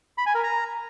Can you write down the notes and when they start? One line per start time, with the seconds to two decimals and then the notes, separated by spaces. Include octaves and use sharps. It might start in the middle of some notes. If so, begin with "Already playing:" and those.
0.18 B5
0.26 G#5
0.35 A#4
0.43 A#5